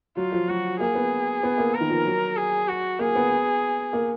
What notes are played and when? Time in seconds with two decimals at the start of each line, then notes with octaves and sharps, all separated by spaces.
0.17 F#3 F4
0.32 F3
0.48 F#3 F#4
0.80 A#3 G#4
0.95 B3
1.43 B3
1.58 A#3
1.74 A#4
1.81 D#3
1.90 F3
2.06 F#3
2.37 G#4
2.68 F#4
2.99 A#3 G#4
3.15 B3
3.93 A#3